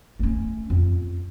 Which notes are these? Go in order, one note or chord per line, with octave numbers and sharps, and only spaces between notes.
A3 C#4
F2